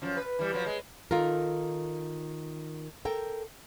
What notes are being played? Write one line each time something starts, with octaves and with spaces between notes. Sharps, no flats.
F#2 F3
B4
E3 G3
F3 F#3
G#3
D#3 F4 A4 A#4
A4 A#4 G5